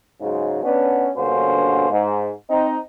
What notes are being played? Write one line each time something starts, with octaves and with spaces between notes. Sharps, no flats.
G#2 C#3 F#3 G#3
B3 C#4 D4
G2 B2 D3 A#3 C#4 C5
G#2
C4 D#4